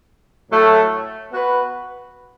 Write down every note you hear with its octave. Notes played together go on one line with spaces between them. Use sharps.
A2 F#3 A3
B3 F#4 B4